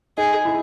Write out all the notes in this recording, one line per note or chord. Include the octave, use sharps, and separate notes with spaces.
D#4 G#4
E4